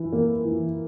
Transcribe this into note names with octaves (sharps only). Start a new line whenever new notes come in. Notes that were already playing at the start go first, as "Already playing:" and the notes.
Already playing: E3
A#3
E3